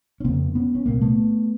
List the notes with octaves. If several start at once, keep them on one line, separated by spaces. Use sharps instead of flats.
C#4
F2 C#3 A#3 C4
B3 C#4
C#4
C2 A#2 A#3 C4
A3 B3